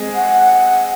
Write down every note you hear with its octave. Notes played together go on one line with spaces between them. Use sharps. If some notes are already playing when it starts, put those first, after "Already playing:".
Already playing: G#3 C4 G#4
F#5